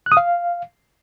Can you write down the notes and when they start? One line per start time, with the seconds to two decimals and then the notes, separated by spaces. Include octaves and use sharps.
0.06 F#6
0.12 D#6
0.17 F5